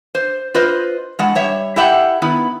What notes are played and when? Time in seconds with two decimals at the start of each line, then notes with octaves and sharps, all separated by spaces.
0.15 C5
0.54 F4 B4 C5 D#5
1.19 A2 G#3 F#5
1.35 G3 C#5 E5
1.76 E4 G4 A4 E5 F#5 G5
2.22 D#3 B3 E4